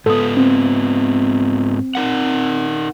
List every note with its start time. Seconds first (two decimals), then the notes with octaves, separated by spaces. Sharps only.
0.06 G#2 B3 A4 D#6
0.37 C4
1.95 D#4 A#4 F#5